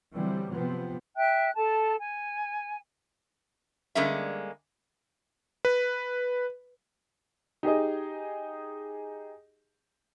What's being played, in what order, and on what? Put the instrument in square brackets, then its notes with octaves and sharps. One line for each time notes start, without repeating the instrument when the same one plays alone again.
[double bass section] D3 E3 F#3 G3 C4
C3 F3 B3 C4
[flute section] E5 G5 F#6
A4 A5
G#5
[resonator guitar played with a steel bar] D3 G3 G#3 A#3 C#4 E5
[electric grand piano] B4
[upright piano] D#4 G4 G#4 D#5